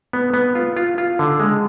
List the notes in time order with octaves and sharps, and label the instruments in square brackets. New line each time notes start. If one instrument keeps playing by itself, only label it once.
[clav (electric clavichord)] B3
B3
F4
F4
F4
D3
G#3